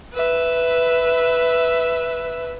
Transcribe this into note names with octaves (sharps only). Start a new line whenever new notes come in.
B4 E5